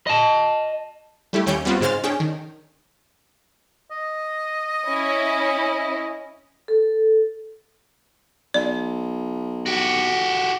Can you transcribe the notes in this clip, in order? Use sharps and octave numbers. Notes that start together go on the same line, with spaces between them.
D#5 A5
G3 A3 E4 G4
D#2 G3 C#4 G6 D7
G3 B3 C4 F4 F#4
G#2 C#3 G#3 C5 F6 A6
C#4 D4 G#4 G5
D#3
D#5
C#4 E4
A4
B1 D5
F#4 G4